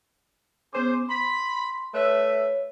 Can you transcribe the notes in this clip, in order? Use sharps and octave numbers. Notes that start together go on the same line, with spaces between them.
B3 C#4 G#4 C5 C6 D6
B5 C6
A3 B4 C#5 E5